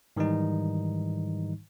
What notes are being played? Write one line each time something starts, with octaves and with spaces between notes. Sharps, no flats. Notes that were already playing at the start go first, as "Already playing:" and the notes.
G#2 D#3 E3 G3 D#4